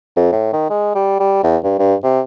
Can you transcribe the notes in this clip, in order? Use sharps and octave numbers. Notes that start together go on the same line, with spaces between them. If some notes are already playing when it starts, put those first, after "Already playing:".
F2
A2
D#3
G#3
G3
G3
E2
G2
G2
C3